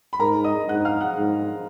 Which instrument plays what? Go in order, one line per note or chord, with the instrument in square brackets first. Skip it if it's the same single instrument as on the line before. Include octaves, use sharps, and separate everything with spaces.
[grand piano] B5
[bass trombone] G#2 [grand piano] A#4 A#5
[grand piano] D#5 D#6
[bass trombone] G#2 [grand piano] F#5 F#6
[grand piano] F5 F6
F#5 F#6
[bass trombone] G#2